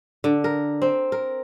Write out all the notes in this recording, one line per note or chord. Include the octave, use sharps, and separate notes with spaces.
D3
A#4
C4
A#4